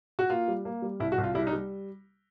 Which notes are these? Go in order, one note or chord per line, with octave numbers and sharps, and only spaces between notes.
F#4
A#3 F4
G3
A#3
G3
C2 E4
F#4
C2
F4
G3 E4
D#4
G3